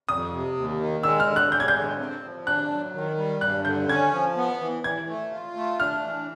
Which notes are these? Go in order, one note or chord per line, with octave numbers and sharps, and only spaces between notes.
F2 D#6
C3
D#2
D#3
G#3 E6
F6
D3
F#6
G#3 G6
G#6
G6
D3
C4
F3
D4 F#6
F#3
D#3
G3
G2 F#6
D3 G6
C#4 G#6
F3
B3
E3
E3 G#6
A3
F4
A3
D4 F6
E3